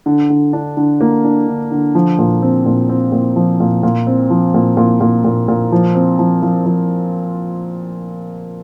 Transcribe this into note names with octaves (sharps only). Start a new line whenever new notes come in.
D3
D3
D4
D3
A#3
D4
D3
D3
F3
A#2
C4
A#2
C4
A#2
F3
A#2
A#2
C4
F3
A#2
A#2
A#2
A#2
A#2
F3
C4
F3
F3
F3